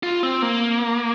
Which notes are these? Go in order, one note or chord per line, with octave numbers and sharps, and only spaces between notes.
F4
C4
A#3